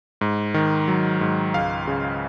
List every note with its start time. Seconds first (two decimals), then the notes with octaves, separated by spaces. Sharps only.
0.21 G#2
0.54 D#3
0.88 F#3
1.21 G#2
1.54 C#2 F5
1.87 C#3